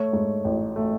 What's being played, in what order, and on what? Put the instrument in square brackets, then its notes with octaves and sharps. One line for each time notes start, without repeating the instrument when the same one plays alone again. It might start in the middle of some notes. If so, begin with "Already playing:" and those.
Already playing: [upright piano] A3 [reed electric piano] C#5
[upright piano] G#2
A1
A3